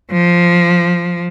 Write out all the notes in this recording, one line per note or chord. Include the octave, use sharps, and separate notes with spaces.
F3